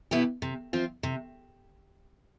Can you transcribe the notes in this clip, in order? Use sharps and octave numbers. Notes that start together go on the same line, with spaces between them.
B2 B3 E4 G4
C3
F3 C4 F4
C3